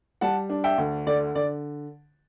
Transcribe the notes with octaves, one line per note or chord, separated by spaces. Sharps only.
G3 F#5 A5
D4
E5 G5
D2
D3 D5
D3 D5